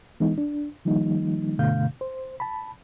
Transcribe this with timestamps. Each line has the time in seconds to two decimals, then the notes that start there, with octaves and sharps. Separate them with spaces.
0.20 E3 G#3 B3 D#4
0.38 D4
0.85 D#3 F3 G3 A#3 D#4
1.59 G2 B2 D3 A3 F5 G6
2.01 C5
2.40 A5 B5